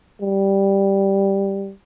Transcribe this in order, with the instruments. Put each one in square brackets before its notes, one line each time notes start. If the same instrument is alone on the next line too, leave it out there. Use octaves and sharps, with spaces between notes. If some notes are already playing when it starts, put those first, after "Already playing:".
[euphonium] G3